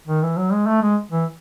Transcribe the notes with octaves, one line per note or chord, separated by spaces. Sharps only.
D#3
E3
F#3
G#3
A3
G#3
E3